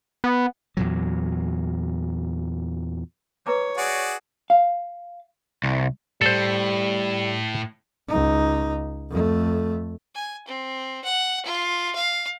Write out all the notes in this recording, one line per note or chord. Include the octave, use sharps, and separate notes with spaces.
B3
E2 A#2 F#3
B4 C#5 A#5 D6
F#4 G#4 D5
F5
C2
A2 G3 A4 C5
C#2 D#4
F2 A3
G#5
C4
F#5
F4
F5